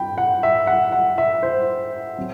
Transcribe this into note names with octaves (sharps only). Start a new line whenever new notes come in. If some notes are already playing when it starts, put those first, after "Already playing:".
Already playing: G2 C4 G5 B5
F#5
E5
F#5
F#5
E5
C5
F#3 C4